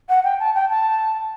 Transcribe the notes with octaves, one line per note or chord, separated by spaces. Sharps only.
F#5
G5
A5
G5
A5